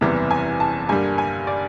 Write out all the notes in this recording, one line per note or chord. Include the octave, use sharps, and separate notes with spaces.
F#1 E2 C3 E3 G3
G#5
A5
G2 D3 G3 A#3 G#5
G#5
D5